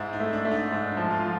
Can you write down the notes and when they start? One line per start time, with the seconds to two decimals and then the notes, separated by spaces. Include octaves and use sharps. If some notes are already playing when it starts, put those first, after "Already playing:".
Already playing: G#2 E4
0.13 D#4
0.20 A3
0.33 D4
0.45 A3
0.51 D#4
0.72 G#2 D4
0.91 E4
0.97 F3
1.11 F4
1.24 F3